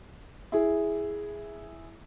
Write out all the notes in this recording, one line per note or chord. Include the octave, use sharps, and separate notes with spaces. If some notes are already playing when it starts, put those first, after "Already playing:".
E4 G#4